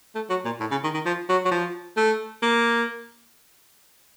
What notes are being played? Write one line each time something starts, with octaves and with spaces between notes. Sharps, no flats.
A3
F#3
A#2
A2
C#3
D#3
D#3
F3
F#3
F#3
F3
A3
A#3